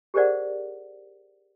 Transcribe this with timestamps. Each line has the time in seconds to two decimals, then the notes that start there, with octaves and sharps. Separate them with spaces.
0.14 G4 G#4 A#4 C5 D5 F#5